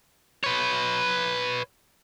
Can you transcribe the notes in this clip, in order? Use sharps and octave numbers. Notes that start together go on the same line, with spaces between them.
B4 C#5